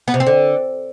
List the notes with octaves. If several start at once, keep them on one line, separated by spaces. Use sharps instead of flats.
B3
C3
C4
D3